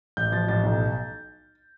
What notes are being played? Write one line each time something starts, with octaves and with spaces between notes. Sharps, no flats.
A1 G6
F3 A6
A1 A6
B1